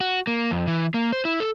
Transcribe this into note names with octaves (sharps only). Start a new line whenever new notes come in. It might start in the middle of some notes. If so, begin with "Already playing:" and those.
F#4
A#3
F2
E3
A#3
C5
E4
A4